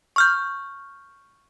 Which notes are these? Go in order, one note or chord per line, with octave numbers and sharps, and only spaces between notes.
C#6 F6 G6